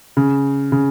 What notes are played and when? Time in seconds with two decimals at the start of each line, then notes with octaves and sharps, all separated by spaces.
0.17 C#3
0.72 C#3